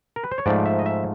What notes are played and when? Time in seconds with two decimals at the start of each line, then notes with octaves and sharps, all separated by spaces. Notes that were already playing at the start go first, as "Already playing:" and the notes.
0.16 A#4
0.24 B4
0.31 C5
0.38 C#5
0.46 G#2 F3 A3 D5
0.66 E5
0.79 D#5
0.86 E5